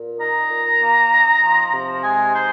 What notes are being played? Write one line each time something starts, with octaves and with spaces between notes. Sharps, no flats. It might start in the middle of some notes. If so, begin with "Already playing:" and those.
Already playing: A#2
D#4 A#5
A#2
A#3
D#4
F3
C3
G#3 G#5
D#4 C5